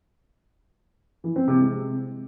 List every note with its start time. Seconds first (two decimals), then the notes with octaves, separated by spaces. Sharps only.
1.24 E3
1.36 C4
1.48 C3
1.60 G#3